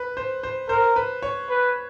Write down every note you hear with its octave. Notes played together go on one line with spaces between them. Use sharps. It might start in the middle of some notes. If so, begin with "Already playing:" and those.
Already playing: B4
C5
C5
A#4 C5
B4
C#5
B4